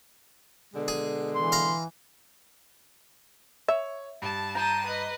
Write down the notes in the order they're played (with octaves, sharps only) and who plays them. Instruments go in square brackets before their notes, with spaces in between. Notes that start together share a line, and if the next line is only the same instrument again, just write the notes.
[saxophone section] B2 D3 G#3
[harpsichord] G#4
[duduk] E3 [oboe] C6
[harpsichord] F5 A#5
[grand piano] C#5 [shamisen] E5
[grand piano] G2 [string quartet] A5
[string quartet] G5 A5 D#6 [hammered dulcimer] A#5
[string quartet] B4 D#5